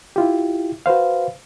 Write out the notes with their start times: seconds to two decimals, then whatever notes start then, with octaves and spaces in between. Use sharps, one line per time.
0.16 E4 F4 G4
0.86 F#4 B4 C5 F5